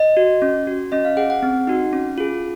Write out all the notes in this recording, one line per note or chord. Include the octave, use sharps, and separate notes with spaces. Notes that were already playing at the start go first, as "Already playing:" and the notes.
Already playing: D#5
F#4
C#4
F#4
C#4 D#5
F5
G#4 F#5
F#5
C4
D#4 F#4
C#4
F4 G#4